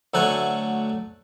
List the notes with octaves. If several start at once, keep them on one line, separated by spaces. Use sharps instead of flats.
D2 F#3 A3 A4 F#5 G#5